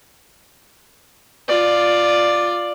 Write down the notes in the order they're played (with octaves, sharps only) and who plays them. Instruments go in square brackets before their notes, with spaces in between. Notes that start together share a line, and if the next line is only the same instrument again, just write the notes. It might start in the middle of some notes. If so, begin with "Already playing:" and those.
[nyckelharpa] F4 D5